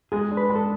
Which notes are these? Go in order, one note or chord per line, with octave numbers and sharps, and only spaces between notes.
G#3 G#4
D4
B4
G#3
A4